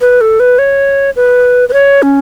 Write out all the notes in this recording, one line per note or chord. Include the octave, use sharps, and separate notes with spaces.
B4
A4
B4
C#5
B4
B4
C#5
C#4